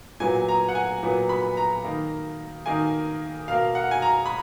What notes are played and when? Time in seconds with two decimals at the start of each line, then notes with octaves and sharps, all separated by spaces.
0.20 A#2 F#3 B3 G#5
0.48 A#5
0.69 F#5
0.75 G#5
1.03 A#2 F#3 B3
1.29 B5
1.57 A#5
1.85 D#3 A#3
2.66 D#3 A#3 G#5
3.48 B2 A#3 F5
3.75 F#5
3.91 G#5
4.02 A#5
4.26 B5